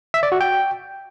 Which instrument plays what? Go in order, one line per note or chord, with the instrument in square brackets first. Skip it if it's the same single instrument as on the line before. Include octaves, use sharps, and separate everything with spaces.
[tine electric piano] E5
D5
F#4
G5